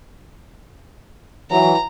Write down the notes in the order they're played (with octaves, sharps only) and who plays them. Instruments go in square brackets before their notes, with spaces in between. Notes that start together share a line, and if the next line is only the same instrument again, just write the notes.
[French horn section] E3 F#3 [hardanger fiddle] A#5